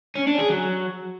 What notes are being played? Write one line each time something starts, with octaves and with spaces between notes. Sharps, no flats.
C#4
D4
G#4
F#3